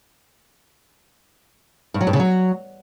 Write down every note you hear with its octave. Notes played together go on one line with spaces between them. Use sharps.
G2
F#3
G2
C#3
F#3